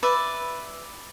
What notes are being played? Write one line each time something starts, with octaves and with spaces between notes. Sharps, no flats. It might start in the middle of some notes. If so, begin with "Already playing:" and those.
B4 D5 E5